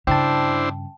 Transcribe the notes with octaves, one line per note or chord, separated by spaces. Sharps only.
G2 C#3 D4 E4 C5 G5 A5